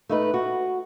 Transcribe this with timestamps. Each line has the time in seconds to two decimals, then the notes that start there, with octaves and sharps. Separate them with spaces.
0.09 A3 D#4 B4
0.34 F#4